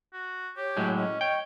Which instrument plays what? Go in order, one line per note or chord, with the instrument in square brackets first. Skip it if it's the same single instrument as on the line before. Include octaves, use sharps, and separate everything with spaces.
[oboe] F#4
[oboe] G4 [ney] C#5
[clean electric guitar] A2 F#3 G#3
[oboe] C#4 [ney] D#5
[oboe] C#5 [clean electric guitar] G5